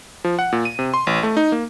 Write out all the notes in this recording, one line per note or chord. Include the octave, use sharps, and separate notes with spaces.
F3
F#5
A#2
D#7
C3
C6
A1
A3
D#4
A#3